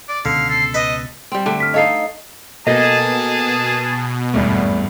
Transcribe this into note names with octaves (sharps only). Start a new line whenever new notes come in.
D5
C#2 B2 D3 C#4 F5
A4 C7
B4 D#5
G3 C4
D3 A3
F6 B6
D#4 A4 C#5 D#5 F5 C7
B2 A#3 G#4 A4 D#5 A5
G#1 E2 G2 A3